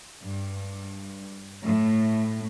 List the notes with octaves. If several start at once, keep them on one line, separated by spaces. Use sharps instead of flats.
G2
A2